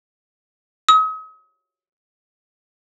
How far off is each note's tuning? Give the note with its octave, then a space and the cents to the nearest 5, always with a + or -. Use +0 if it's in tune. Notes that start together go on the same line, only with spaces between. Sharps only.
D#6 +40